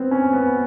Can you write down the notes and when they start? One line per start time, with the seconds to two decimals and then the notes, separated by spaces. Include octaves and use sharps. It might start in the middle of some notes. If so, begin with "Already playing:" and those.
Already playing: B3 C4
0.11 C#4
0.33 B3